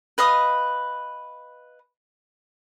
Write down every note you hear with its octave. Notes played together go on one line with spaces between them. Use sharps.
B4 D#5 F5 D#6